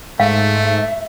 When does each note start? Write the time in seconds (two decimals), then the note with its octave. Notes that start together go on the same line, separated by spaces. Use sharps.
0.20 G#2 A3 E5 F5